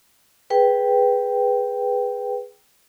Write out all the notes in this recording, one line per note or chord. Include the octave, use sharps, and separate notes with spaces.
G#4 B4 G5